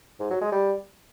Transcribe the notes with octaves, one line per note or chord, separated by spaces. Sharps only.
G#2
F#3
G#3
G3